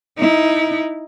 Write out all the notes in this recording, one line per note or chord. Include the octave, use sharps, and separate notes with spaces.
D#4 E4